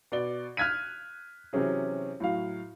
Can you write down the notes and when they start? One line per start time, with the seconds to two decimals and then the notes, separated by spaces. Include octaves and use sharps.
0.12 B2 D5 G7
0.57 F6 F#6 G#6 B6 D#7
1.53 C3 E3 F#3 C#4 G#4
2.20 A2 F#3 F5